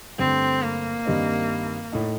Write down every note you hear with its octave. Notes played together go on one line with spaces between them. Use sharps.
G2 D3 A3 C4
A#3
G2 D#3 G3 C4 D#4
A2 A3 D#4